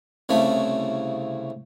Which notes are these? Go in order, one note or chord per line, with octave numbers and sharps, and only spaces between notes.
C2 C#3 A3